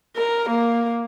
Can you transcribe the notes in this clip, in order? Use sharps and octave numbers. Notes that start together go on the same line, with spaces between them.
A#4
A#3